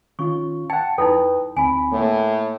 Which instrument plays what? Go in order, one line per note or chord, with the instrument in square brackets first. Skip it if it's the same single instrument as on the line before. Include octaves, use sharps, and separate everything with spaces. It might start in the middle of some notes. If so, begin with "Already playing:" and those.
[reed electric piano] D#3 C#4 F4 [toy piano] C#6
[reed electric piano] F#5 A5 [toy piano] G5
[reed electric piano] F2 B4 G5 [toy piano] D#4 E4 A4
[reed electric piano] D2 C4 B5 [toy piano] G#5
[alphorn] A2 [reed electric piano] A#3